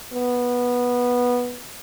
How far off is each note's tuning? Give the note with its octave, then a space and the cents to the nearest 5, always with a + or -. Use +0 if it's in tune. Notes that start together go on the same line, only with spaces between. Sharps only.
B3 -10